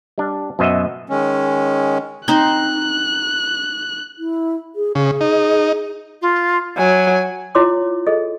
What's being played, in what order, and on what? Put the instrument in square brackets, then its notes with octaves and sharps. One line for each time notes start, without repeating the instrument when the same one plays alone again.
[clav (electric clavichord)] G3 D4
F#2 B2 C5 D#5 E5 F#5
[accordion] D#3 G#3 C#4
[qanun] C4 D#4 C5 [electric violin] F#6
[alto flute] E4
G#4
[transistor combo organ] C#3 [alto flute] G#4
[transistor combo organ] D#4
[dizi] F4
[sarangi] F#3 [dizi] G#5
[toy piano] E4 F4 C#5 C6 D6
G#4 A4 D#5